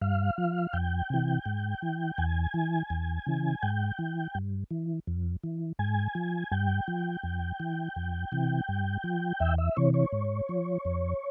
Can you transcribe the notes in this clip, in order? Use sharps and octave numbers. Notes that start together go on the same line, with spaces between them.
G2 F5
F3
F2 G5
C3 E3
G#2
E3
E2 G#5
E3
E2
C#3 E3
G#2 G5
E3
G2
E3
F2
E3
G#2 G#5
F3
G2 G5
F3
F2
E3
F2
C3 E3
G2
F3
E2 E5
E5
C3 E3 C#5
C#5
G#2
F3
F2